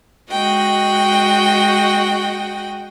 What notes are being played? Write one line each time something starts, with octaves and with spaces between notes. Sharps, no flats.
G#3 F#4 D#5 G5